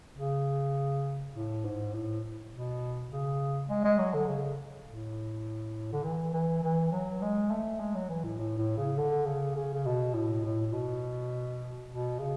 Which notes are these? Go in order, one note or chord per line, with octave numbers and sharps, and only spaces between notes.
C#3
A2
G#2
A2
B2
C#3
G#3
G#3
F#3
D3
C#3
A2
D3
E3
E3
E3
F#3
G#3
A3
G#3
F#3
E3
A2
A2
A2
C#3
D3
C#3
C#3
C#3
B2
A2
A2
B2
B2
C#3